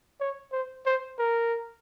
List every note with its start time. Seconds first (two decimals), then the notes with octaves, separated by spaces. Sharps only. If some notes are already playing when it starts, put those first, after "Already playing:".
0.21 C#5
0.52 C5
0.86 C5
1.19 A#4